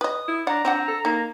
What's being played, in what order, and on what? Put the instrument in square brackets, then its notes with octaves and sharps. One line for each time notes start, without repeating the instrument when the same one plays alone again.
[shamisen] B4 D#5 [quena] D#6
[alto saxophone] E4
[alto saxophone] D4 [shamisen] F#5 [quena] A#5
[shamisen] F3 D4 F#5 [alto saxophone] C4
[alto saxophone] A4
[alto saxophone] A#3 [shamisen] D#4